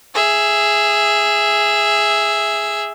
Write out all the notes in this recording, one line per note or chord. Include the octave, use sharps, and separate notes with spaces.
G#4 E5